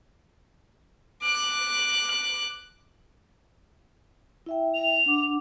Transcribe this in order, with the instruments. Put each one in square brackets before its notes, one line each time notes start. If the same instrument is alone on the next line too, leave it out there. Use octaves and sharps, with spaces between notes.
[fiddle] D6 F#6
[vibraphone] E4 E5 G5
[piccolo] F7
[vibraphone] D4 F#5 D6